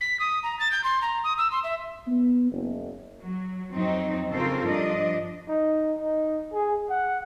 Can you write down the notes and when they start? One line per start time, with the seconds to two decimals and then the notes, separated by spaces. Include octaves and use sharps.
0.01 B6
0.20 D#6
0.43 A#5
0.59 A6
0.71 G6
0.84 C6
1.02 A#5
1.24 D#6
1.38 E6
1.52 C6
1.64 E5
2.08 B3
2.52 F#1
3.19 F#3
3.70 F2 F#3 C4 D#4
4.30 C#3 C4 F4 A4 A#4 C5
4.66 G2 F3 D4 D#5
5.48 D#4
5.99 D#4
6.52 G#4
6.90 F#5